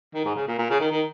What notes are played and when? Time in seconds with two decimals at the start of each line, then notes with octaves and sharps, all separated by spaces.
0.15 D#3
0.25 G#2
0.36 C#3
0.48 A#2
0.58 A#2
0.70 C#3
0.80 D#3
0.91 D#3